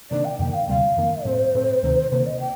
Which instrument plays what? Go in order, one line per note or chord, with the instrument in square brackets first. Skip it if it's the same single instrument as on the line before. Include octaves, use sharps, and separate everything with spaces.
[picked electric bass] C3 D#3 A#3 D4 [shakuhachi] D5
[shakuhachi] G5
[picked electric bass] F2 C3 D#3 A#3 [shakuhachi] G5
[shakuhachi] F5
[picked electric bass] D2 C3 G3 [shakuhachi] F5
[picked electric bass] F2 D#3 A#3
[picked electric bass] A2 A3 C4 [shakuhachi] C5
[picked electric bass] A2 A3 C4
D2 C3 D#3
[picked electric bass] C3 D#3 A#3 [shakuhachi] C5
[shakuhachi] D#5
G5